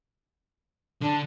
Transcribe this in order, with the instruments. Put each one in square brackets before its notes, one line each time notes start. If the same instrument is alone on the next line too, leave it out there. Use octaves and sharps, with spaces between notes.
[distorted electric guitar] D3 [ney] D4